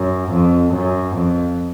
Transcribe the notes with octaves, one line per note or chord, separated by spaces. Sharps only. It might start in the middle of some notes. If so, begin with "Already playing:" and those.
Already playing: F#2
F2
F#2
F2